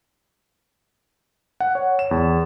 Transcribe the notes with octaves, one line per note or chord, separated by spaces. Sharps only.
F#5
C#5
E7
E2